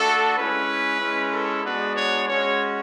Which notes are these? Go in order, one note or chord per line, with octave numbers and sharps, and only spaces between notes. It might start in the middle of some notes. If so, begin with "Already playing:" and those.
Already playing: A3 D4 F#4 A4
G#3 C#4 E4 B4
G#3 C#4 E4
A4
G#3 B3 D4 F#4 B4
C#5
G#3 C#4 F#4 C#5